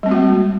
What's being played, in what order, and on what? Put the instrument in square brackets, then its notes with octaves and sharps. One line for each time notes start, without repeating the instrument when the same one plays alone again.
[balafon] G3
C4
G#3
F#4
A#3